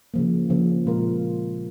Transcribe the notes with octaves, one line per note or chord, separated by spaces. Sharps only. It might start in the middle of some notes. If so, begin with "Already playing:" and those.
C#3 F3 A#3
C#3 F3 A#3
A#2 G#3 F4 A#4